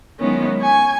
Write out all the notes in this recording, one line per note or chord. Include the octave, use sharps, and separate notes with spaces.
D#3 F#3 G#3 B3 C#4 E4
G#5 C#6 G#6